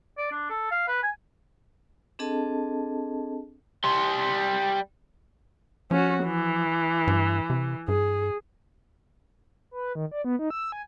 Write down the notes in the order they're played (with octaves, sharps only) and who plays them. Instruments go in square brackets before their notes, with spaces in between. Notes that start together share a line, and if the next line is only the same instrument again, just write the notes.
[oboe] D5
D4
A4
F5
B4
G#5
[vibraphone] C4 D4 G#4 A4 D#5 A5
[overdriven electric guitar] G3 C6
[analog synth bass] F3 [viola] C#4 F#4
[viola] E3
[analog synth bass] G2
C3
[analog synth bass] G2 [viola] G#4
[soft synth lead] B4
D#3
D5
B3
D#4
E6
G#5